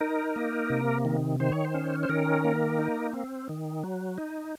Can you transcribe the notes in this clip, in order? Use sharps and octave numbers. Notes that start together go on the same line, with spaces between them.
D#4 A#4
A#3
C3
D#3
D#3 C5
C#5
C5
C#4
C5
D#3 A#4
A#3
D#4
C4
D#3
F#3
D#4